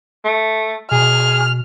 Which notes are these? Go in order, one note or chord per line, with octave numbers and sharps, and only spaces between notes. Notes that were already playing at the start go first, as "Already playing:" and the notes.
A3
B2 G#4 F6